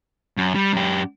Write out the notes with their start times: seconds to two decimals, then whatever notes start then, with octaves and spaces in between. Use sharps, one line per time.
0.37 F#2
0.55 G3
0.73 F#2 G4